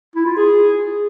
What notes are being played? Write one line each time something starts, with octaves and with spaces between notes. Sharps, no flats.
E4
F4
G#4